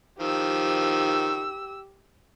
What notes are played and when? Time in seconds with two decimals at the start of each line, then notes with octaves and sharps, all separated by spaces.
0.20 D#3 F3 G4 E6